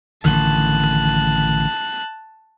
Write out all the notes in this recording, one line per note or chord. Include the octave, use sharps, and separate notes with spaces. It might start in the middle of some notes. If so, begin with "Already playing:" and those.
A1 D3 D#3 A5 F#6